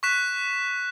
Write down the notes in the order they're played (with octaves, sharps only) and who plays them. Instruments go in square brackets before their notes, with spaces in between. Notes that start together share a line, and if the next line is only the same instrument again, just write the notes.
[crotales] C#6 F#6 B6 E7